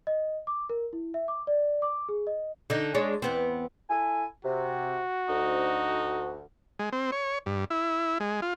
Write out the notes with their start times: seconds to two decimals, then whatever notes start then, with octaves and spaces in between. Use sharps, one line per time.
0.07 D#5
0.47 D6
0.70 A#4
0.93 E4
1.14 E5
1.28 D6
1.47 D5
1.82 D6
2.09 G#4
2.27 D#5
2.70 D3 D#4
2.94 G#3 D4 C#5
3.22 E2 B3 C4
3.89 E4 A4 G#5
4.44 C3 F#4
5.29 D2 D#4
6.79 G#3
6.92 C4
7.12 C#5
7.46 G2
7.70 E4
8.20 G#3
8.42 F4